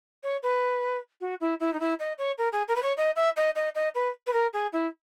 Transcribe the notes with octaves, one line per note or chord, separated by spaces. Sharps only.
C#5
B4
F#4
E4
E4
D#4
E4
D#5
C#5
A#4
G#4
A#4
B4
C#5
D#5
E5
D#5
D#5
D#5
B4
B4
A#4
G#4
E4